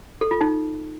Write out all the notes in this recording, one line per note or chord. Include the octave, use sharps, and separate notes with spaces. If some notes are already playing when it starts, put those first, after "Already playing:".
A4
F4
D#4